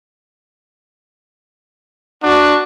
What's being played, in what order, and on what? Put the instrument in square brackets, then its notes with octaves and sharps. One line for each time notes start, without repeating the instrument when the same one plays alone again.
[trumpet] D4 [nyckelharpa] F#4 C#6